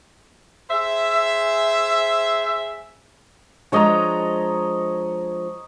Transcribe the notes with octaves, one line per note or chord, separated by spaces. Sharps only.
G#4 C5 E5
F3 G#3 D4 C#5 D#5 A#5